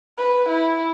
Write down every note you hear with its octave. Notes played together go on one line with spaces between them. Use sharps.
B4
E4